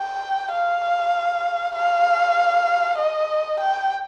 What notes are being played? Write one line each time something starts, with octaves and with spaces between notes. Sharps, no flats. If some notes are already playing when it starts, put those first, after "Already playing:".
Already playing: G5
F5
F5
D#5
G5